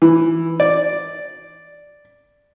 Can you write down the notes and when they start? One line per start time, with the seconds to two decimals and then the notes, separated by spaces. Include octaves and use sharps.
0.02 E3
0.60 D5